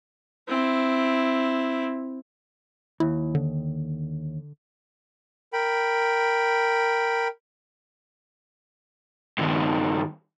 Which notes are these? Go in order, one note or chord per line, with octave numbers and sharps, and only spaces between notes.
C4 E4
D#2 E4
D3
A#4 G5 B5
G2 D#3